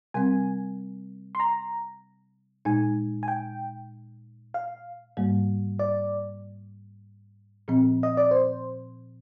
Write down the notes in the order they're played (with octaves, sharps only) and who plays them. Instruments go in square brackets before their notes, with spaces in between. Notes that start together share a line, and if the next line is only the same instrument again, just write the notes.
[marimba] C3 G3 C4 [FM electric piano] G#5
[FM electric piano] C6
A#5
[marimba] A#2 G#3 D#4 [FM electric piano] G#5
[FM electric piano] G#5
G5
F5
[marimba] G#2 G3 A#3
[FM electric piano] D5
[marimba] A#2 F3 C4
[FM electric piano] D#5
D5
C5